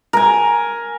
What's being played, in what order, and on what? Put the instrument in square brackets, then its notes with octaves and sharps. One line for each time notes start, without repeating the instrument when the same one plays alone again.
[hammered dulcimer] A#4 G#5